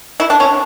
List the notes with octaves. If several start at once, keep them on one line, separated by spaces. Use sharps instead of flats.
E4
D4
C#4